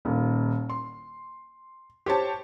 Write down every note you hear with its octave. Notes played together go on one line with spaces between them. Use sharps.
D#1 D#2
C6
G4 C5 C#5 A5